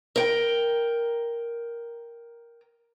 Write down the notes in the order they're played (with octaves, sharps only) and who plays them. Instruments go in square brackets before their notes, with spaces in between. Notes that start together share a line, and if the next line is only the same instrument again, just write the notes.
[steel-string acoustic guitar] A#4 G5